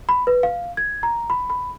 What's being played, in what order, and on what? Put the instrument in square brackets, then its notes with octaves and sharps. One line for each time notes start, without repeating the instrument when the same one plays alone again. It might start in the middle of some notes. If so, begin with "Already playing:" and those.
[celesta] B5
B4
F5
G#6
A#5
B5
B5